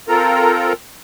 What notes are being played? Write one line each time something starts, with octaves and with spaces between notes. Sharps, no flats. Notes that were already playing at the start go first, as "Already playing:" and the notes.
C4 F4 A4 A#4 A#5